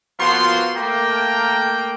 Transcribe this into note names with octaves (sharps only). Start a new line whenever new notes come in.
F3 A#3 B3 F4 F#4 C6
A3 A#3 G5